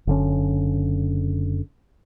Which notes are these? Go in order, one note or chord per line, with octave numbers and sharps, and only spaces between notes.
F#1 D3 C#4